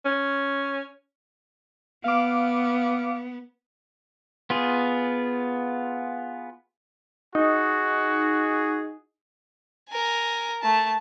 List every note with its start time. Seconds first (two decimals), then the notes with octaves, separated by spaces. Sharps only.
0.05 C#4
2.04 B3 F5 D6
4.50 B3 F4 G#4
7.35 D#4 F#4 G#4
9.90 A#4 G#5
10.62 A3 A5